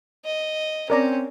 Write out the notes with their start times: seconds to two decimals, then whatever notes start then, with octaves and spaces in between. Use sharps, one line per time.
0.25 D#5
0.90 C4 C#4 A#4 D5 A#5